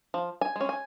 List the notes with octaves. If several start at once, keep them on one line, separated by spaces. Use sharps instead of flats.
F3
G#5
G#3 C#4
G#5